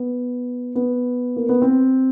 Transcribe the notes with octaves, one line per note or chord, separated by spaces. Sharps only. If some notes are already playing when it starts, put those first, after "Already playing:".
Already playing: B3
B3
A#3
B3
C4